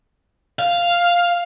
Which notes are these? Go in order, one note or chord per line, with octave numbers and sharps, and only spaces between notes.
F5